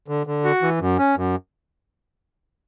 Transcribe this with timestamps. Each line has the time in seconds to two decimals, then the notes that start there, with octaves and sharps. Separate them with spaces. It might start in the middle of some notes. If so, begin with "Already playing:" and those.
0.08 D3
0.27 D3
0.44 F#4
0.62 E3
0.80 F#2
0.98 C#4
1.17 F#2